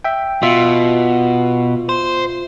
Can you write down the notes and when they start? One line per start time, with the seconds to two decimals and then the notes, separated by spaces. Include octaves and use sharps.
0.04 E5 G5
0.43 B2 F4 E5
1.89 C5